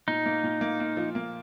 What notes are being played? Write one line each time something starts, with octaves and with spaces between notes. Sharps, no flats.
A#2 D#4
A#3
A#2
A#3
A#3
F3
A#3